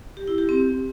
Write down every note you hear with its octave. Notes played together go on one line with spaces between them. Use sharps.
G4
E4
G4
C4